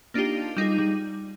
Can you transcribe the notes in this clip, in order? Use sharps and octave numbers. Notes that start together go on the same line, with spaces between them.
A#3 D4 D#4 F4 G4
G3 D#4 F4 G#4
G3